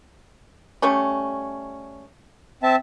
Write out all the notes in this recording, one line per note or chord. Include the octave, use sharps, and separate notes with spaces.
G3 A3 C#4
C4 E5 A5